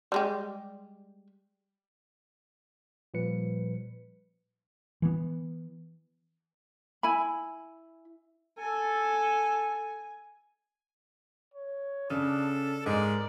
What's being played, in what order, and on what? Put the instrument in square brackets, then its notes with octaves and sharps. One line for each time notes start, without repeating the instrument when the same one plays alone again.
[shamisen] G3 G#3 G4
[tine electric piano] A#2 F3 G3 B4 C#7
[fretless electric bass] E3 B3
[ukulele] E4 G#5 B5
[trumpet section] A4 [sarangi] G#5
[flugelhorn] C#5
[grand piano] C#3 [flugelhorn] D4 [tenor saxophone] A4
[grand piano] G#2 [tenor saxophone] G#3 [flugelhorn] A#4 [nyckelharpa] D5